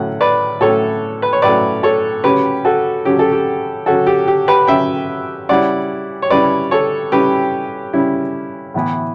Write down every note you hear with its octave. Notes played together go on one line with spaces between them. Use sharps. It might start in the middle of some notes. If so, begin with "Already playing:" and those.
Already playing: A2 F#3 A3 C#4 F#5
B4 D5
A2 F#3 A3 C#4 A4 C#5
B4
C#5
A2 F#3 A3 C#4 B4 D5
A4 C#5
C#3 F#3 C#4 G4 B4
F#4 A4
C#3 F#3 C#4 G4
A4
G4
C#3 F#3 C#4 F#4 A4
G4
G4
G4 B4
C#3 F#3 C#4 E5 G5
C#3 G3 C#4 E4 D5 F#5
C#5
C#3 G3 C#4 E4 B4 D5
A4 C#5
C#3 G3 C#4 E4 G4 B4
C#3 G3 C#4 E4
A2 E3 B3 E4